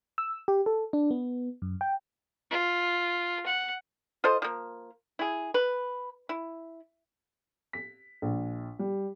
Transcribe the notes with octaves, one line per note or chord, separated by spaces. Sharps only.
E6
G4
A4
D4
B3
F#2
G5
F4
F#5
F4 A4 C5 D#5
F3 A#3
E4 G#4
B4
E4
B6
A#1
G3